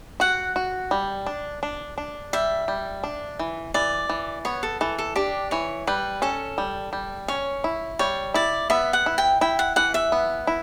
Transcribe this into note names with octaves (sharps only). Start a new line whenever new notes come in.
F#4 F#5
F#4
G3
D4
D4
D4
G3 E5
G3
D4
E3
E3 D5
E3
B3 C#5
A4
E3 A4
A4
D4 G4
E3 C#5
G3 B4
C#4 A4
G3
G3
C#4 C#5
E4
G3 C#5
E4 D5
B3 E5
F#5
E4
G5
E4 G5
F#5
E3 F#5
E5
B3
E4